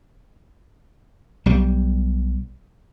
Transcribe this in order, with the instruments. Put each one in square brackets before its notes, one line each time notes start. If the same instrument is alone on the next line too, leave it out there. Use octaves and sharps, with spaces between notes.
[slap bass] B1 G3